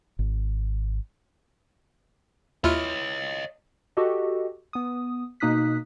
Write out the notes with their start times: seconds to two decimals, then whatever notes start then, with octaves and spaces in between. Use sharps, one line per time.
0.19 G#1
2.64 D#2 E4 F4 C#5 D#5 F6
3.97 F#4 G4 A4 D#5
4.73 B3 D#6
5.40 B2 A#3 D#4 D#6 F#6 B6